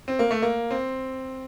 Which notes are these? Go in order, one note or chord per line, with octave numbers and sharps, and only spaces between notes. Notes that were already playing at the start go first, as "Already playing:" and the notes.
C4
A#3
A3
A#3
C4